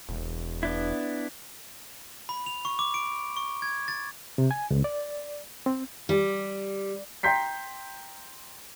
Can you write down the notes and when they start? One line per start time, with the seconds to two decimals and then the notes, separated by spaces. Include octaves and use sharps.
0.09 E1
0.63 B3 D4 E4
2.29 B5
2.46 F7
2.65 C#6
2.79 D6
2.94 D7
3.37 C#6
3.62 G#6
3.88 A6
4.38 C3
4.51 G#5
4.71 C#2
4.84 D5
5.66 C4
6.09 G3
7.23 G5 A#5 C6 G6 B6 C7